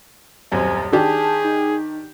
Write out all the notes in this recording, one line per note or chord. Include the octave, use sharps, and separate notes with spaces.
D#1 F#2 C4 G#5
D#3 D4 G4 G#4 A5
D#4